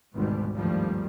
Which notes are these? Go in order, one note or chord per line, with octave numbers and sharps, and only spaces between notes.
G#1 D2 G#2 B2 G3
G#1 D2 G2 D#3 F3 G3